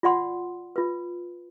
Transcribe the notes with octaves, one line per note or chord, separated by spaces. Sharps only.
F4 D5 F#5 C6
F4 B4